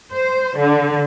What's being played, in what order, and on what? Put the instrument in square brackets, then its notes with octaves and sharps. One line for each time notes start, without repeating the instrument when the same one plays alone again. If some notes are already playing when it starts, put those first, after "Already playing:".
[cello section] C5
D3